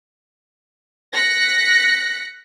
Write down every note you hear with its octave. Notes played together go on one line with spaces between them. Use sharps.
F#6 A#6 B6 C#7